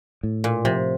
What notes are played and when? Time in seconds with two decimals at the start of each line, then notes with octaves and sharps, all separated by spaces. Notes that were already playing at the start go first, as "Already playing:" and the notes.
0.23 A2
0.44 A#2
0.65 C3 F3